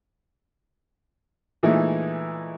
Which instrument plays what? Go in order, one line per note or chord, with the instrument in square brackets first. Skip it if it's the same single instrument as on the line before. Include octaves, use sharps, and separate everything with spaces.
[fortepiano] A#2 E3 G#3 A3 D#4 E4